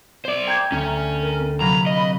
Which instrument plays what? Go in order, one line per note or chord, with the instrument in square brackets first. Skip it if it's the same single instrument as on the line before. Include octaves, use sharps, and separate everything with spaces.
[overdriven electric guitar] C5 D5
[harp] G5 G#6 [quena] A#5
[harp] D2 [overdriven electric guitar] C#4
[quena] A#4
[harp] C3 F#3 A#3 [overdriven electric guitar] A#5 [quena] B5
[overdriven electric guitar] D#5